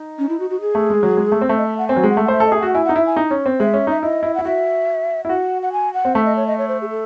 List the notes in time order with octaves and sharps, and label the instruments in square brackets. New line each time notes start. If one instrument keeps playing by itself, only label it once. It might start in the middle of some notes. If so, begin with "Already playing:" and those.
Already playing: [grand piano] D#4
[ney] C#4
E4
F#4
F#4
G#4
[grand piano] A3
G#3
F#3
G#3
A3
C4
A3
[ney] D#5
E5
F#5
[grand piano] C4 [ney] G#5
[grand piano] F#3
G#3
[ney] F#5
[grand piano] A3
[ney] F#5
[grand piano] C5 [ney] E5
[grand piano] A4
[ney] D#5
[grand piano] G#4 [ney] E5
[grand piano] F#4 [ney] F#5
[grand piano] E4 [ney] G#5
[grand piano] D#4 [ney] F#5
[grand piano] E4 [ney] E5
[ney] G#5
[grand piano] D#4
C#4
C4
[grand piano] G#3 [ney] E5
[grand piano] C#4
[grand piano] D#4 [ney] E5
[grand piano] E4 [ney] D#5
[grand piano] E4
[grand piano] E4 [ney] F#5
[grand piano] F#4 [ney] E5
[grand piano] E4
[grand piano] F#4 [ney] F#5
[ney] F#5
G#5
F#5
[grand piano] C4
[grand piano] A3 [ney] E5
[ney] D#5
C#5
D#5
C#5
C5
G#4
A4